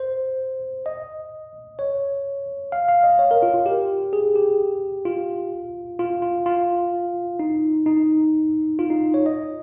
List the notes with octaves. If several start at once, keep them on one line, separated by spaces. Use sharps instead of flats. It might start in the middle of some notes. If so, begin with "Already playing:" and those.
Already playing: C5
D#5
C#5
F5
F5
D#5
C#5
A#4
F4
F4
G4
G#4
G4
F4
F4
F4
F4
D#4
D#4
F4
D#4
C#5
D#5